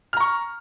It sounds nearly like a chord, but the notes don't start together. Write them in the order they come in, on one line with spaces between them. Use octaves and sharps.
F6 A#5 C#6